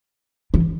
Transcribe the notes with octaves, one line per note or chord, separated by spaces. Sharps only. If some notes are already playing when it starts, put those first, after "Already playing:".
E3